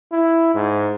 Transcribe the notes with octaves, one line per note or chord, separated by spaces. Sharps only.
E4
G#2